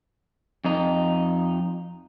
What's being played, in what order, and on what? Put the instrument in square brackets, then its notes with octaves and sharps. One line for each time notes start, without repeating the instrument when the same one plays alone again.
[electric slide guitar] F2 D#4